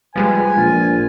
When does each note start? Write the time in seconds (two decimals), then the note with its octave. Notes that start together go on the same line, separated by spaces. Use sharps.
0.16 F3 G3 G#3 B4 G#5
0.57 A#1 F4